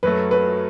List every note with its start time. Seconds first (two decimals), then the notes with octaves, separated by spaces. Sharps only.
0.03 F#2 F#3 A3 B4
0.31 B4